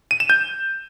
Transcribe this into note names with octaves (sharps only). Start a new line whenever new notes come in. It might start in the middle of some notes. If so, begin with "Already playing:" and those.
D#7
E7
G6